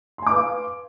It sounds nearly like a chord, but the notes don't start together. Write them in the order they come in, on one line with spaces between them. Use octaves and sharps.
C6 G#5 D6 B4 F5